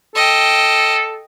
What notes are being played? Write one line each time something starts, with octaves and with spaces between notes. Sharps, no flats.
A4 D#5 G5